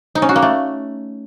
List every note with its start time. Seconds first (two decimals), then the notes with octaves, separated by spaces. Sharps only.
0.15 D#4
0.22 C#4
0.29 F#4
0.36 A#3
0.42 A3